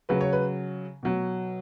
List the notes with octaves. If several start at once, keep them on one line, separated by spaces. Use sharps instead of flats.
C#3 F#3 B4
C#5
B4
B2 F#3